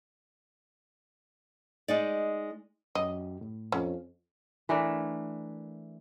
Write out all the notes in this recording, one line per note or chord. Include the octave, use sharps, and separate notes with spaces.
G#3 D#4 D5
F#2 G4 D#5
A2
F2 C#4
E3 A3 D4 A#4